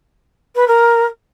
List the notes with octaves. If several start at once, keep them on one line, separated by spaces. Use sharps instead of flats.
B4
A#4